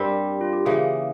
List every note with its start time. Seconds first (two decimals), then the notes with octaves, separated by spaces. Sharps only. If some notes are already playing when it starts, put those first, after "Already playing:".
Already playing: G2 G3 C4 G4 A#4
0.41 F4
0.53 G4
0.66 C#3 E3 A#3 G#4